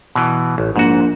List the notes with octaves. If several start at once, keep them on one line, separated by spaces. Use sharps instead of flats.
B2 E3
A1
A#1 G#2 F#4